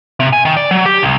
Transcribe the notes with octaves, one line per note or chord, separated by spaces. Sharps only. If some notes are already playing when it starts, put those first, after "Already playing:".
C3
G#5
D#3
D5
F#3
G4
C2